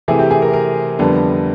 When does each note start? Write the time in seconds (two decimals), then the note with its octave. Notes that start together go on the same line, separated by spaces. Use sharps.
0.08 C3 E3 A3 C4 G#4
0.19 G4
0.31 G#4
0.42 A#4
0.53 A#4
0.99 F2 D3 G3 B3